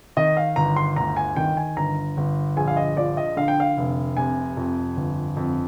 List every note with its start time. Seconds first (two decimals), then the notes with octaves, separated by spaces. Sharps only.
0.17 D#3 D#5
0.37 F5
0.56 G1 A#5
0.76 C6
0.96 D2 A#5
1.17 G#5
1.36 D#3 G5
1.57 G#5
1.77 G1 A#5
2.17 G1
2.57 A#1 G#5
2.68 F5
2.77 D#5
2.97 F3 D5
3.17 D#5
3.36 D3 F5
3.48 G5
3.60 F5
3.77 F1
4.17 C3 G#5
4.57 F2
4.96 G1
5.37 F2